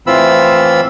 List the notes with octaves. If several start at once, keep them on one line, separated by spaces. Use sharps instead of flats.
A2 E3 C4 F4 B5 E6